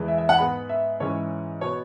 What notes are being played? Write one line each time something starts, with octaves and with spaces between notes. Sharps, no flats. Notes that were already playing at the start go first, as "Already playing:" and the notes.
Already playing: E2 E3 G#3
E5
E5
F#5
G#2 G#3 B3 B5
E5
G#2 E3 C#4 C#5
B2 B3 C#5